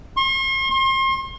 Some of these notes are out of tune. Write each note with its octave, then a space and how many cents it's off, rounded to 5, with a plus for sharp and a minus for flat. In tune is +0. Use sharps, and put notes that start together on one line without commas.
C6 +45
C6 +35